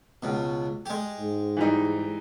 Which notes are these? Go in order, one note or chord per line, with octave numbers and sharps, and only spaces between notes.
C#2 B2
G#3 G4
G#2
E3 G3 D#4